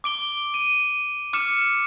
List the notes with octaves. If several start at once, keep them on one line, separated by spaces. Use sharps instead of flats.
D6 D7 G7
D#7
D6 F6 C#7 E7